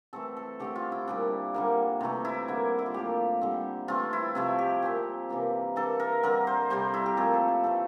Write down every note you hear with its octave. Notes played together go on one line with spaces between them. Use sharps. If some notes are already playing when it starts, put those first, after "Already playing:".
E3 A3 C4 A4
A4
D3 A3 C4 G4
F4
E4
A#2 G3 D4
D3 G3 A#3
C3 E3 A3
E4
D3 G3 A#3
E4
F4
A2 F3 A#3 G4
D3 G3 C4
E3 A3 C4 F4
E4
C3 F3 A3 E4
G4
A#2 F3 C4
C3 E3 A#3 D4
E3 A#3 D4 A4
A#4
D3 G3 C4 A#4
C5
C3 G3 D4 C5
E4
G4
A#2 F3 A3 C4 A4
A4
E4
E3 A3 C4 A4